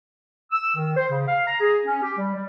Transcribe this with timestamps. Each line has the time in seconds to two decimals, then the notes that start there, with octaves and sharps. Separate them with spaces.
0.51 E6
0.76 D#3
0.96 C5
1.09 C#3
1.27 F5
1.47 A#5
1.61 G#4
1.86 C#4
2.02 G4
2.17 G3
2.34 G3